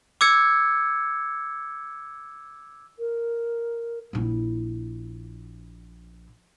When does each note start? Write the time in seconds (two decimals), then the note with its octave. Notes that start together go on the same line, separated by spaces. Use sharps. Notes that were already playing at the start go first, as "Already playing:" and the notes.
0.21 D6 E6 G#6 C#7
2.99 A#4
4.13 A#1 E4